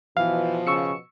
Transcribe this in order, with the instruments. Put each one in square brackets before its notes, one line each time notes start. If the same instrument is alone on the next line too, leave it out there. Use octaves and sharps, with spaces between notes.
[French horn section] B2 F3 [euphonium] E3 [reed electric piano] F5
[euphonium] C#3 [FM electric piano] C#6 E6 C#7